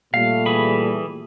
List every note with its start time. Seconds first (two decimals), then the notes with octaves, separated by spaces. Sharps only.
0.14 A#2 G3 A3 F5
0.46 E3 G#4 B5